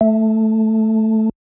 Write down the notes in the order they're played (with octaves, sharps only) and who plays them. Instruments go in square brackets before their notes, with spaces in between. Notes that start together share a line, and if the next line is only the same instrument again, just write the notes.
[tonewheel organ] A3